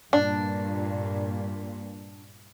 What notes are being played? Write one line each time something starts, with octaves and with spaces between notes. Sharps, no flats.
G2 A#2 D4